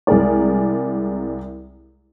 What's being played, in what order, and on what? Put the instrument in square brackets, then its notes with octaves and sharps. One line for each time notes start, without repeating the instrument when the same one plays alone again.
[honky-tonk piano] C2 G#3 G#4 A#4 D5